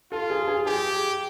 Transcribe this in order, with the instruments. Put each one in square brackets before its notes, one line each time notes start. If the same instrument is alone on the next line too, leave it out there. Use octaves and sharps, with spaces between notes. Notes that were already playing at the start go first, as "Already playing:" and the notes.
[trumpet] F4 [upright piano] A4
[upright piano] G#4
G#4
[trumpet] G4 [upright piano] G#4